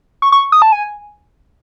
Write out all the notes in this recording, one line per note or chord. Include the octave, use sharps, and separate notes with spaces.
C#6
C#6
D#6
A5
G#5